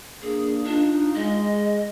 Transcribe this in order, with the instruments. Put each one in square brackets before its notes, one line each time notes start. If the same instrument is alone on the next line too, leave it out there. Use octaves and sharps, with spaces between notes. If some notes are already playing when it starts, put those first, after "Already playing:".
[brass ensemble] A#3 D4 [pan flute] G#4
[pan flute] D4 [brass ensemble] D#4 F4
[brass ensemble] G#3 [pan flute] D#5